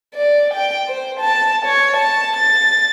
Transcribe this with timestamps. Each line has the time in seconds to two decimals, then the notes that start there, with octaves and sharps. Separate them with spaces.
0.15 D5
0.54 G5
0.88 C5
1.20 A5
1.65 C#5
1.97 A5
2.37 A6